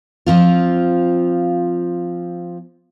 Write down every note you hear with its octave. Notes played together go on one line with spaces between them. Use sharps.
F3 C4 F4